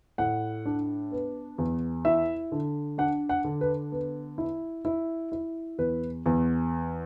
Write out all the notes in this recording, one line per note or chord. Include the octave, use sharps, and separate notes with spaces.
A2 F#5
D4
B3
E2
E4 E5
D3
D4 F#5
F#5
D3
B4
B3
E4
E4
E4
E2 B4
E2